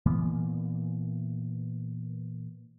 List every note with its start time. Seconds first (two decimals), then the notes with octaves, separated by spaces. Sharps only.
0.06 A#2 E3 A#3 B3